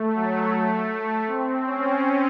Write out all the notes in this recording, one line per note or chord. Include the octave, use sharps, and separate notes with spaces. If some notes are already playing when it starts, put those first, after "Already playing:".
Already playing: A3
F#3
A3
C4
C#4